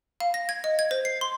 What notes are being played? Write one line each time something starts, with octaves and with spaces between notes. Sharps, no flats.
F5
A#6
G#6
D#5
G#6
C5
C7
C6